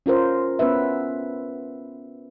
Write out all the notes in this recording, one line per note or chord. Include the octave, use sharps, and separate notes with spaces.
C#4 F4 A#4 C5
B3 C#4 B4 E5